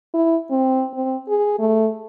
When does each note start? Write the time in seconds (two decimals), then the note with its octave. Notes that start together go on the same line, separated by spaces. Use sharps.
0.14 E4
0.51 C4
0.94 C4
1.29 G#4
1.59 A3